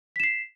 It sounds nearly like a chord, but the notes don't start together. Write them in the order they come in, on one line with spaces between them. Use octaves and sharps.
B6 E7 C7